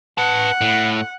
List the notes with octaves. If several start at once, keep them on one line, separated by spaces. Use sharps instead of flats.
B4 F#5 A5
A2